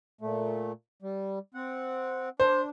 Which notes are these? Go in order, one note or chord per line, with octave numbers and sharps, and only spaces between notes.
A#2 A3
G3
C4 F#5
D4 C5